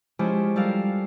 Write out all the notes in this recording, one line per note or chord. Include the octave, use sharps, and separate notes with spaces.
F3 G#3 C#4 E4 G4
G3 A4 A#4 F5